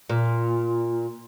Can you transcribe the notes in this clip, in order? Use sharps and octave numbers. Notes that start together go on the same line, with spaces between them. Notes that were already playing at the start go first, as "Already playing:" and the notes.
A#2